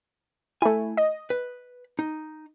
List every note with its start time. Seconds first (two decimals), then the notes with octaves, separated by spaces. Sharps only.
0.62 A3 E4 G#5
0.97 D#5
1.30 B4
1.99 D#4